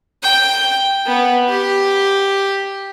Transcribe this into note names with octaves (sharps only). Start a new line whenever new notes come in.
G5
B3
G4